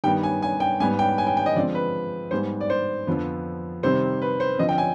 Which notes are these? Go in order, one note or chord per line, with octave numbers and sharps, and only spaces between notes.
G2 D#3 G3 B3 G5
G#5
G#5
G5
G#2 G3 B3 G#5
G5
G#5
G5
G5
D#5
D3 F3 G#3 C4 D5
B4
G#2 G3 B3 C5
D5
C5
F2 D3 F3 B3
C3 D#3 G3 C4 C5
B4
C5
D3 F3 C4 D#5
G5
G#5